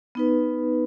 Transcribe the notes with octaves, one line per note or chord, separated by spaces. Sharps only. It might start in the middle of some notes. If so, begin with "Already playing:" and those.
B3 D#4 B4